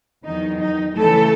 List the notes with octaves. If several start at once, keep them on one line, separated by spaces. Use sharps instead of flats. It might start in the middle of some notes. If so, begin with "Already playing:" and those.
E2 D#3 F#3 D#4
D#4
C#3 E3 A3 A4